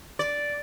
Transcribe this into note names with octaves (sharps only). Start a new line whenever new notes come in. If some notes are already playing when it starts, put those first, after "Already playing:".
D5